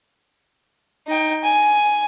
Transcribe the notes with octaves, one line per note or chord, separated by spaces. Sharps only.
D#4 G5
G#5